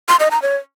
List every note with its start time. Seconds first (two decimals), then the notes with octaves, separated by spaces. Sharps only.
0.09 C6
0.20 D#5
0.31 A#5
0.42 C#5